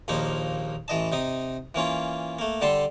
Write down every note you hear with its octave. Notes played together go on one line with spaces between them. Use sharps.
A#1 D#2 F3 A#3 D#4
A1 E3 D#5 A5
C3 D#4 D#6
E3 A#3 C#4 F4
A3 A#3
D3 G3 A4 A5 C6